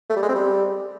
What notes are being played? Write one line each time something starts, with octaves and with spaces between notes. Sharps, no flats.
A3
G3
G#3
C4
G3